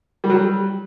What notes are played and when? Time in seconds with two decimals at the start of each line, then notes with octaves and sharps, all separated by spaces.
0.24 G3
0.29 F#3
0.35 G3